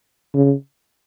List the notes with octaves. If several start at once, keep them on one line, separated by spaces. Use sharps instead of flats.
C#3